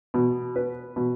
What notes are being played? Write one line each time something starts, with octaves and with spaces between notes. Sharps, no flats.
B2
B4
B2